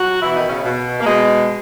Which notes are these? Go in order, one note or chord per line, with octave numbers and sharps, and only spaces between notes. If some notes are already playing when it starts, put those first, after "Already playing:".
Already playing: F#3 F#4
B2 E3 E4
D#3 D#4
C#3 C#4
B2
A#3
B2 G#3